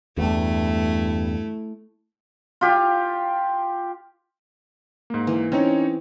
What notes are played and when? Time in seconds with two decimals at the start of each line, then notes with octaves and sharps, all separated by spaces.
0.18 E2 G2 A3 E4
2.61 F4 G4 F5
5.10 G#2 A#3
5.27 E3
5.52 C4 C#4 D#4 C#5